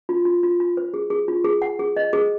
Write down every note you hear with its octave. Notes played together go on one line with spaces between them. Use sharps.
F4
F4
F4
F4
C5
G#4
G#4
F4
G#4
F#5
G#4
D#5
G#4